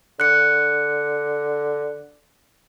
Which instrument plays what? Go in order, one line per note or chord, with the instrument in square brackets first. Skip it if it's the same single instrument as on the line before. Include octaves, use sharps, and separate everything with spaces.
[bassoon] D3 [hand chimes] F#6 C#7